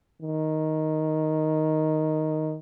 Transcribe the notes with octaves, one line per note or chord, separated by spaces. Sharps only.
D#3